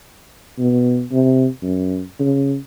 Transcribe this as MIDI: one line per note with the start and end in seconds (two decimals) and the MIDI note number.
0.59 1.05 47
1.12 1.47 48
1.63 2.03 42
2.20 2.57 49